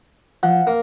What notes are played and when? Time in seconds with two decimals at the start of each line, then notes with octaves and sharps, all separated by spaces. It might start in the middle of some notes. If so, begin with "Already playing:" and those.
0.43 F3 F#5
0.67 A#3